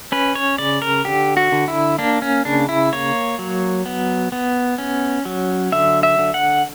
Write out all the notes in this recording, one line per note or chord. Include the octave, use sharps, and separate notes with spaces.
C#4 B4
C#5
C#3 D5
A#4
D3 G4
F#4
D3
E4
A#3 D4
C#4
C#3 D4
E4
A#3 C#5
F#3
B3
B3
C#4
F#3
D3 E5
E5
D3
F#5